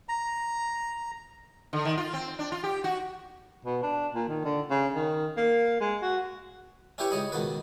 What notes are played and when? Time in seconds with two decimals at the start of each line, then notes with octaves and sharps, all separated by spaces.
0.09 A#5
1.73 D3
1.85 D#3
1.97 F4
2.13 C4
2.39 D4
2.52 F4
2.63 G4
2.84 F#4
3.65 B2
3.83 D4
4.15 A#2
4.28 D#3
4.45 D3
4.71 C#3
4.95 D#3
5.37 A#3
5.81 G#3
6.02 F#4
6.98 C#4 E4 G4 B4 C#5
7.11 C#2 C#5 D#5 B5
7.32 C#2 B2 D#3 B4